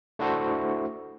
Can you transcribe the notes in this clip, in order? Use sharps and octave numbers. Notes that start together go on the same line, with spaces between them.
A3 D4 E4 F#4 A4 C5